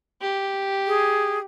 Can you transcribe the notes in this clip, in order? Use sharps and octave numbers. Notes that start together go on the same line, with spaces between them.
G4
G#4